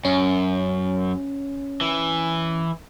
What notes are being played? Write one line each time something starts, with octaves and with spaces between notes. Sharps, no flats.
F#2 C#4
E3